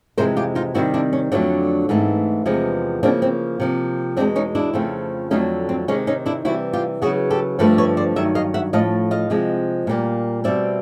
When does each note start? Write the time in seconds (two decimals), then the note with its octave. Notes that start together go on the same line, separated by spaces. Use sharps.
0.17 F2 C3 E3 G#3 A#4 C5
0.37 F4 G4
0.55 D#4 F4
0.74 C3 D#3 G3 C4 E4 F#4
0.94 D4 E4
1.13 C#4
1.32 F2 D3 F#3 A3 C4 D4
1.89 G#2 E3 A3 C4
2.46 E2 C3 F3 G#3 B3
3.03 C#3 F3 A#3 C4 D4
3.22 C4
3.60 C3 F3 A#3
4.17 E2 B2 G#3 C4 D4
4.36 C#4 D#4
4.55 D4 E4
4.73 F2 C#3 F3 A3 C4
5.31 F2 D3 F#3 A3 C#4 D#4
5.69 C4
5.88 C3 D#3 G#3 C#4
6.07 C#4 D#4
6.26 D4 E4
6.45 C3 E3 G3 E4 F#4
6.73 F4 G4
7.02 C#3 F#3 B3 F#4 G#4
7.30 G4 A4
7.59 G2 D3 F3 A3 A4 B4
7.78 B4 C#5
7.97 C5 D5
8.16 G2 D#3 F#3 E5
8.35 D#5 F5
8.54 E5 F#5
8.73 A2 F3 A3 D#5 F5
9.11 D#5 F5
9.30 C3 F3 G#3 C4
9.87 A#2 G3 A#3
10.44 B2 G3 C4 D5 E5